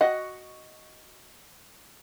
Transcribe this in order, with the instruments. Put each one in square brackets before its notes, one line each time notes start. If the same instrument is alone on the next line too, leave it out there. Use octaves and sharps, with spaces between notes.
[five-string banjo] F#4 D#5 F#5